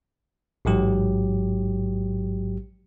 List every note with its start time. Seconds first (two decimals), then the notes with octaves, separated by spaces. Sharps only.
0.65 A1 G#2 F#3 G4